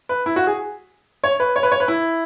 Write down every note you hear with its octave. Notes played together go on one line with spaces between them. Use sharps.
B4
E4
F#4
G#4
C#5
B4
C#5
B4
C#5
B4
E4